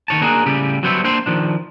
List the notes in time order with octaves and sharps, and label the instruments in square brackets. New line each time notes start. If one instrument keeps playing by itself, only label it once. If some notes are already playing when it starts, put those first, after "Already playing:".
[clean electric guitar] D#3 C#5 A5
A#3 D4 D#4 F#4 G#4 A#4
A2 C#3 G3 G4
F#3 G3 B3 C5 C#5 E5
A#3 D4 C5 G5 C6
D#3 F3 D4